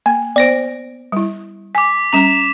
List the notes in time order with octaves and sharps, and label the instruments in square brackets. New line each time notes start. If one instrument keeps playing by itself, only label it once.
[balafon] A#3 [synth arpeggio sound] G#5
[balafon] B3 C5 [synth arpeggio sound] D5 A#6 D7
[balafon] G3 E4
[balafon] G#5 [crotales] D6 B6
[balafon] G3 C#4 A#5 [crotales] B6 E7 F7